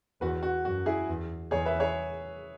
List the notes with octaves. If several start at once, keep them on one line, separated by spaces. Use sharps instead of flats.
E2 F#4 B4
F#4
F#2 F#4
E4 G#4
E2
E2 G#4 C#5
B4 E5
G#4 C#5